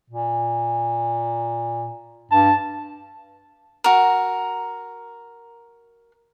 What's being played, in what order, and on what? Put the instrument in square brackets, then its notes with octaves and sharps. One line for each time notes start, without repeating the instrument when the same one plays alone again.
[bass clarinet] A#2
[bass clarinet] G2 [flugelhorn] A5
[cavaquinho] F#4 A#4